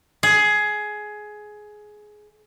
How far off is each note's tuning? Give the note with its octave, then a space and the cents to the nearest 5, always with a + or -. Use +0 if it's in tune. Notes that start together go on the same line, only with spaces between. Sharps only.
G#4 +15